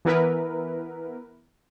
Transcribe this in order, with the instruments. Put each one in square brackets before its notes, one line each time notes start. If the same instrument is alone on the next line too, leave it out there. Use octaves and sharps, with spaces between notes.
[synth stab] E3 B3 E4 A#4 B4